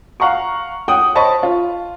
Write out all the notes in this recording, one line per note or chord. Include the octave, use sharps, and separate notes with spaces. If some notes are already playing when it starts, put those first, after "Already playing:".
F5 F#5 A#5 C#6
F#5 G5 D#6
C5 C#5 D#5 A5 B5 C#6
F4